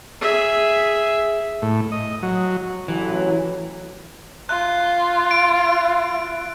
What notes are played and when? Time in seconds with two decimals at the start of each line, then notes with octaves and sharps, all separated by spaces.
0.21 G#4 E5
1.62 A2
1.92 D#5
2.23 F#3
2.88 A1 E3 F#3
4.49 F4 F#6
5.31 D7